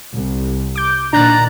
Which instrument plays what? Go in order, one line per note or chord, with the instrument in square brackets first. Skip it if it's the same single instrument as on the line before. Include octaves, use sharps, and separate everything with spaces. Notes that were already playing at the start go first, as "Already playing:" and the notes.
[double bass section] C2
[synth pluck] D6 G6
[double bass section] A#2 D#3 [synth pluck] D4 F#6 A6 [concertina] A#5